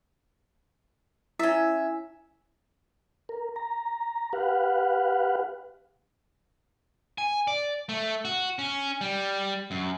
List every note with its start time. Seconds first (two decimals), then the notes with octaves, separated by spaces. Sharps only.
1.39 C#4 E4 E5
3.29 A#4
3.56 A#5
4.33 G4 B4 F5 F#5
7.18 G#5
7.48 D5
7.89 A3
8.25 F#4
8.59 C#4
9.01 G3
9.71 F#2